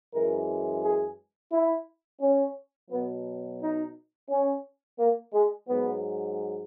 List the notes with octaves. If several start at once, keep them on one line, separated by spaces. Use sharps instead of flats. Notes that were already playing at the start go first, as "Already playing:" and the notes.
F#2 E3 G#3 A#4
G#4
E4
C#4
B2 F#3 B3
D#4
C#4
A#3
G#3
G#2 F#3 B3